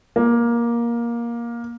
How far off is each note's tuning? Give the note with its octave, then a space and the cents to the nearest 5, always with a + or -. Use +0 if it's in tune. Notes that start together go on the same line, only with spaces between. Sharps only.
A#3 +15